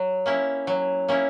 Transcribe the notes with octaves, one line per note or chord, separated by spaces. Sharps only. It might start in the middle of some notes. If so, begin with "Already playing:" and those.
Already playing: F#3
A#3 C#4 E4
F#3
A#3 C#4 E4